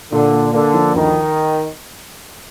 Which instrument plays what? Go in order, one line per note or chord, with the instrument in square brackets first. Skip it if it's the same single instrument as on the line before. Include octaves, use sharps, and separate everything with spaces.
[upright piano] A#2 [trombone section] D3
[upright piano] A#3
[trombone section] D3 [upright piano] A#3
[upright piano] F3
[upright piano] D2 [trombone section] D#3